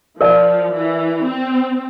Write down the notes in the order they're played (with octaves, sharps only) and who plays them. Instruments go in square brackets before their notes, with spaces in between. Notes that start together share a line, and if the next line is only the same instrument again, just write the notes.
[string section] F3 [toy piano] A#4 D5 F5 A5
[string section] E3
C4